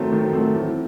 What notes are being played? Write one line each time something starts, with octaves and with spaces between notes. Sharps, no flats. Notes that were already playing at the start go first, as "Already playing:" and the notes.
Already playing: D#3 F#3 A3 C4
D#3
F#3 A3 C4
E3